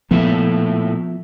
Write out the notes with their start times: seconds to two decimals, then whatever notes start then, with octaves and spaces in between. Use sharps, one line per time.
0.11 A#2 F3 A3 B3 E4